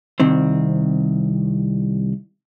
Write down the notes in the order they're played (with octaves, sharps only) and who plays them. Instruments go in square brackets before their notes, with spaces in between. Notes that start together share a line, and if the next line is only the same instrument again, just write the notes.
[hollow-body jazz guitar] C2 D#3 C4